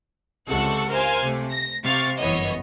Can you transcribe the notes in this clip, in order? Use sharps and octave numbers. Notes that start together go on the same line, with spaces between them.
C#2 C3 A4 F#5 C#6
A#4 C5 F5 G#5
C3 A3
A#6
C3 F5 C#6 A6
G1 F#2 E3 B3 C#5 D#5